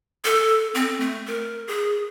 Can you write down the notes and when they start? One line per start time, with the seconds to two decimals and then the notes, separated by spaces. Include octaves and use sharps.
0.25 A4
0.75 C4
1.00 A3
1.27 A#4
1.67 G#4